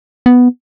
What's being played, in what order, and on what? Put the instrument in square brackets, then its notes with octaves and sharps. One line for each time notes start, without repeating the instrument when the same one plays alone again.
[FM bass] B3